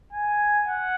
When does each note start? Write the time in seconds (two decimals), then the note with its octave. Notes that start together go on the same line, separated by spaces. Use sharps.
0.13 G#5
0.67 F#5